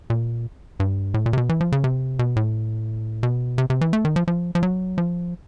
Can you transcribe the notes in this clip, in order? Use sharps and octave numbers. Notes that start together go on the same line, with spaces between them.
A#2
G2
A2
A#2
C3
B2
E3
F3
C#3
C3
B2
A2
B2
C3
C3
E3
A3
D#3
F3
F3
F3
F#3
F3